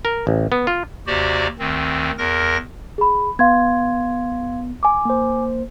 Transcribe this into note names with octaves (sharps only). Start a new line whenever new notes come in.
A#4
A1
B3
F4
D#2 C3 F#4 G4 C5 D5
D2 D#3 C4
E2 A#4 A#6
G#4 B5
B3 F5 C6 G#6
G#5 D6
A#3 C5